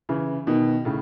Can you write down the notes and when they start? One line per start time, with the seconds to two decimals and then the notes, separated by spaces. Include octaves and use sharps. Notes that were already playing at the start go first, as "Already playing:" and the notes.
0.09 C#3 E3
0.47 B2 D#3
0.85 A2 C#3